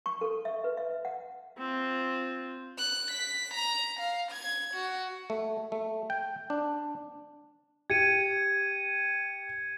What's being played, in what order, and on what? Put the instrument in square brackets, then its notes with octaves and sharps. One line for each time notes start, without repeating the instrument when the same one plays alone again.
[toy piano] C#6
A4
E5
B4
E5
F#5
[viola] C4 F4
[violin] F#6
B6
A#5
F5
G#6
F#4
[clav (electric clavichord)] A3
A3
G5
D4
[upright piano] G4 [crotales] G#6 C#7 D#7